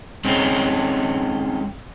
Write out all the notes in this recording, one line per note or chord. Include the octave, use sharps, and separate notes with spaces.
G#3 C4 C#4 D#4